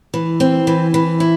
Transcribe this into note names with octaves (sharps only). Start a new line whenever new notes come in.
E3
C4
E3
E3
E4